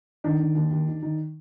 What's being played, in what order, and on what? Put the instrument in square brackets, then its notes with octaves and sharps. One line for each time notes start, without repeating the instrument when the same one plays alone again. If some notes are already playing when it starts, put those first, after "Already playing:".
[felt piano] D#3 D4
D#3
D#2
D#2
D#3
D#3